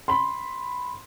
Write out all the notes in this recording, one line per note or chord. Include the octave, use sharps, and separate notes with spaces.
B5 C6